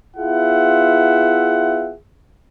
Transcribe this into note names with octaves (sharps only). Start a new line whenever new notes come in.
B3 E4 F4 G#4 E5 F#5